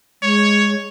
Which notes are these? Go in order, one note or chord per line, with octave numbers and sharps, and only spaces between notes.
G#3 C#5